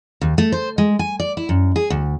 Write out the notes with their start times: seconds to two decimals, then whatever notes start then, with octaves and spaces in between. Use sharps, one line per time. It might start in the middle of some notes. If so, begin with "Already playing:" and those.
0.21 D#2
0.38 A3
0.52 C5
0.78 G#3
0.99 G#5
1.20 D5
1.37 E4
1.49 F#2
1.76 G#4
1.90 D2